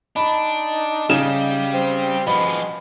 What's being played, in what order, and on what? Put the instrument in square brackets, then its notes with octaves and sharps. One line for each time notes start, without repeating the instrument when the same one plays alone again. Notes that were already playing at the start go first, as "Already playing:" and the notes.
[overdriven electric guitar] D4 [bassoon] D#4 [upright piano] B5
[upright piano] C#3 E7 [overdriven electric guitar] G3
[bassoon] C4
[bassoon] B2 [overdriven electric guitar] F3 G#3 [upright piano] B5